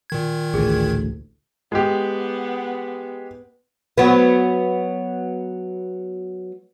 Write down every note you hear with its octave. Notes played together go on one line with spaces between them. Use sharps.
A#2 D#3 G#6
A1 D2 G#4
G#3 B3 G4
F#3 B3